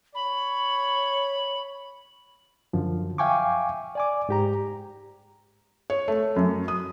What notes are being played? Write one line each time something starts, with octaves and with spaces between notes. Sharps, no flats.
C#5 B5
F#2 D3 F3
E5 F5 G5 G#5 C#6 D6
D5 G#5 D6
G#2 G4 A#5
C#5
A3
F#2
D#6